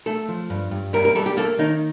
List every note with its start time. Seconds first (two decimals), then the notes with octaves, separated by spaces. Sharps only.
0.06 A3 A4
0.29 F3
0.50 G2
0.71 G2
0.93 G3 A#4
1.05 A#4
1.15 G3 A4
1.26 G4
1.37 A#3 A4
1.59 D#3 D#4